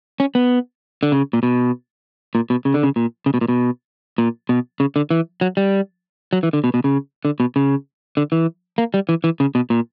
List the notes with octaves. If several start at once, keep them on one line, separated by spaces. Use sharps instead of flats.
C#4
B3
D3
C#3
A#2
B2
A#2
B2
C#3
D3
C#3
A#2
C#3
B2
A#2
B2
A#2
B2
C#3
D3
E3
F#3
G3
F#3
E3
D3
B2
B2
C#3
D3
B2
C#3
D3
E3
A#3
G3
E3
E3
C#3
B2
A#2